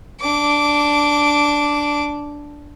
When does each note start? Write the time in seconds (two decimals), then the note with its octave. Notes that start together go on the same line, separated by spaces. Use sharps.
0.21 D4 D6